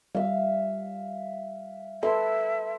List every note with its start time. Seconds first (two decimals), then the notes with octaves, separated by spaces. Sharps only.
0.15 G3 E5 F5
2.03 A4 B4 E5 C6